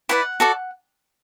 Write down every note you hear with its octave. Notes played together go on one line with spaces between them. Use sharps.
E4 B4 D5 F#5
F#4 A4 D5